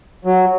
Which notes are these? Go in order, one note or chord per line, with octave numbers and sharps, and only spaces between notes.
F#3